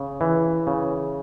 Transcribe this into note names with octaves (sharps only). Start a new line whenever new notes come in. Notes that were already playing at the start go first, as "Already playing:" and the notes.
Already playing: C#3
E3
C#3